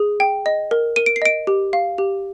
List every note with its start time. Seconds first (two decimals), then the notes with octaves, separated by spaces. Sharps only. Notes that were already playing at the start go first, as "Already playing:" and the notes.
Already playing: G#4
0.20 G5
0.46 D#5
0.71 A#4
0.96 A#4 D#7
1.06 D7
1.16 C7
1.22 D#5 D7
1.47 G4
1.73 F5
1.98 G4